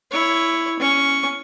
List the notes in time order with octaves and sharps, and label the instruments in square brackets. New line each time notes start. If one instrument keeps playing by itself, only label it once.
[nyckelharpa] E4 C#5
C#4 C#6